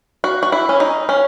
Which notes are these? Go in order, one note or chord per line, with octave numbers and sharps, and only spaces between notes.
F#4
F#4
E4
C#4
D#4
C#4